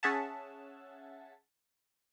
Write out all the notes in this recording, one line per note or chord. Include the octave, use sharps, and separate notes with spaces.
C#4 G#4 E5 F#5 A5